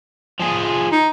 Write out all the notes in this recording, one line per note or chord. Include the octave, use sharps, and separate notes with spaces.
F3 G#4
D#4